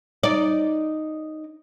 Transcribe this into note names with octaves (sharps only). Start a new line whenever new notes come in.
D#4 D5